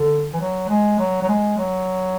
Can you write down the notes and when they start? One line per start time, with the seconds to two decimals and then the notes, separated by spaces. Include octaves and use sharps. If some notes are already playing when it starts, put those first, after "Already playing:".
Already playing: D3
0.34 E3
0.40 F#3
0.69 G#3
0.99 F#3
1.23 F#3
1.29 G#3
1.58 F#3